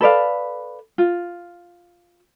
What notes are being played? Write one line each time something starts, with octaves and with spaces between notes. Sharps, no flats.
A4 B4 D5 F5
F4